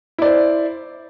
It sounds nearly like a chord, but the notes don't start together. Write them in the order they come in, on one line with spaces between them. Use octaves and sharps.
E4 D5 C5